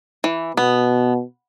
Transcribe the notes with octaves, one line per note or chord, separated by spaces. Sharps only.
E3
B2 B3